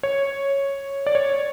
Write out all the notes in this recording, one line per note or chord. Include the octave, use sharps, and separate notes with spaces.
C#5
D5
C#5